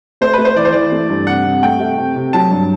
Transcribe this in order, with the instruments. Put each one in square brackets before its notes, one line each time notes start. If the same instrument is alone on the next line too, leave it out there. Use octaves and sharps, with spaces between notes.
[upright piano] A3 [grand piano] C5
[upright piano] A3 [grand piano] B4
[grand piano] C5
[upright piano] E3 [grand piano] D5
[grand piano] C5
[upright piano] E3 [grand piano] D5
[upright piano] A3
G2
[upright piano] C3 [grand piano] F#5
[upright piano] C3
[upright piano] A3 [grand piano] G5
[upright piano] A3
C3
C3
[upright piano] F#3 [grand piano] A5
[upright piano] G2